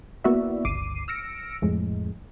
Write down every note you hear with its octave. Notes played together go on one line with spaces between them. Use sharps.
A#3 B3 E4 F#4 D5 E5
G1 C#2 D6 C7 D#7
E6 F6 A#6 C#7 D7
F2 A2 G#3